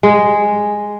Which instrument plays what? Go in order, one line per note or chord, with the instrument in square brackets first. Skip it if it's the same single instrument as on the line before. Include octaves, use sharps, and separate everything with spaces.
[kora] G#3